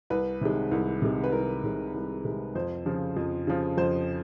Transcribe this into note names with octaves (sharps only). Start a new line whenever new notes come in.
C2 B4
C3 D#3 G#3
C2
C3 D#3 G#3
B4
C2 A#4
C3 D#3 G#3
C2
C3 D#3 G#3
F2 C5
C#3 F3
F2
C#3 F3
F2 C5